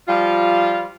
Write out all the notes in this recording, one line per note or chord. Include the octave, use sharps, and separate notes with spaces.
F3 G3 F4